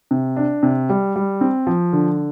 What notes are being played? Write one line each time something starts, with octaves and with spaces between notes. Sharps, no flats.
C3
D4
C3
G3
G3
C4
F3
D3